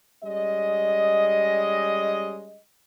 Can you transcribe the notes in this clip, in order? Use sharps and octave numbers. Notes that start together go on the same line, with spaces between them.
G3 G#3 C#4 D#5